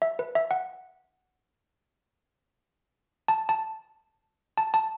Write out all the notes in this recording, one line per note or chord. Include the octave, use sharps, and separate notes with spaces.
E5
B4
E5
F#5
A5
A5
A5
A5